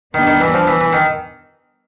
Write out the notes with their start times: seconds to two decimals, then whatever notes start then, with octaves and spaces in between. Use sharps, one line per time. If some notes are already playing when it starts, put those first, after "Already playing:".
0.14 D#3 G3 B3 D4
0.27 D#3
0.40 E3
0.54 F3
0.68 E3
0.81 E3
0.93 D#3